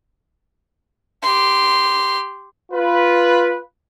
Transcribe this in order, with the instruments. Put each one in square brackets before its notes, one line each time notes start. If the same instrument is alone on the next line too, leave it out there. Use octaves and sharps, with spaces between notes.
[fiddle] G4 C6
[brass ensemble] F4 B4